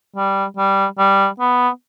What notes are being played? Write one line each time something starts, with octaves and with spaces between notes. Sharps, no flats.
G3
G3
G3
B3